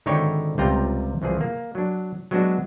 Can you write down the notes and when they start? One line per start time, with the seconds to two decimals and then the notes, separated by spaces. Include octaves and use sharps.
0.06 G#1 D3 D#4 E4 C#5 G5
0.58 C#2 C3 G3 F4 G5 A#5
1.22 C2 E3 F3 G#4
1.41 A#3
1.75 F#3 D4
2.31 F#3 G#3 B3 D4 F#4